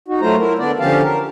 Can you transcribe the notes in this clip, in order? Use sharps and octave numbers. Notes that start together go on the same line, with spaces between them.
D#4 F#4
F#3 A3 F4 C5 A#5
E4 A#4
D3 B3 D4 D5
D3 F3 C#4 G4 F5 A5
A#4